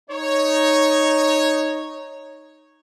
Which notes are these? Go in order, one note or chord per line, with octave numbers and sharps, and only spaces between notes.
D#4 C#5